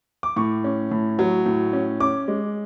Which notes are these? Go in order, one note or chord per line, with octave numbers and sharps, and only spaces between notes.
D6
A2 C#6
C#4
A2
F#3
A2
C#4
C#4 D6
G#3